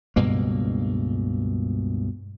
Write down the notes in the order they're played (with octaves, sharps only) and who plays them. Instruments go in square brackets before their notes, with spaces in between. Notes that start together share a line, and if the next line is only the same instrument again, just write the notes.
[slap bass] C#2 G2 B2 A#3